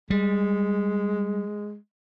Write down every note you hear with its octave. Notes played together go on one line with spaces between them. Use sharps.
G3 G#3